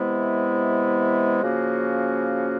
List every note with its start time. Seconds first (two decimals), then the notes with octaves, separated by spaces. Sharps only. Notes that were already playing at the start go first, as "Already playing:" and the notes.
Already playing: C3 E3 G#3 B3 E4
1.42 C#3 F3 A#3 C#4 F#4